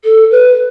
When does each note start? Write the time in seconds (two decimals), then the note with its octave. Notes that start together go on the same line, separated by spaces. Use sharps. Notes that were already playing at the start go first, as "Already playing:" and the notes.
0.04 A4
0.31 B4